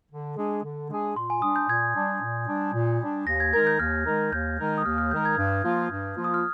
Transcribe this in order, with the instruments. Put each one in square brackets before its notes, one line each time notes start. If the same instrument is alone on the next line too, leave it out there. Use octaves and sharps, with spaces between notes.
[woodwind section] D3
G#3 D4 G#4
D3
G#3 D4 G#4
[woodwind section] A#2 [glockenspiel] C6
[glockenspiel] G#5
[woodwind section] G3 D4 [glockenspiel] D#6
[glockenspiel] G6
[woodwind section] A#2 [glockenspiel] G#6
[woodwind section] G3 D4
A#2
G3 D4
A#2
G3 D4
[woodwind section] D#2 [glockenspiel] A#6
[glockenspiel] G#6
[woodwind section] D#3 G#3 D#4 A#4 [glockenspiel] G#6
[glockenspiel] G6
[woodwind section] D#2 [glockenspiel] F6
[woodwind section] D#3 G#3 D#4 A#4
[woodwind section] D#2 [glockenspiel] G6
[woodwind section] D#3 G#3 D#4 A#4
[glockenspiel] D#6
[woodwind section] D#2 [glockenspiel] F6
[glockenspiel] F6
[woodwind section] D#3 G#3 D#4 A#4 [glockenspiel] G6
[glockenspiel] G#6
[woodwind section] G2
F3 A#3 F4
G2
F3 A#3 F4
[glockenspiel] D#6
F6